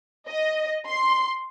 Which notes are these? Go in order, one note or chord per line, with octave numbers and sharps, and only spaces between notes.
D#5
C6